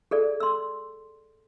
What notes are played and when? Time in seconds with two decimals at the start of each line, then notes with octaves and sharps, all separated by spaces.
0.11 G#4 A4 D5
0.40 C6 E6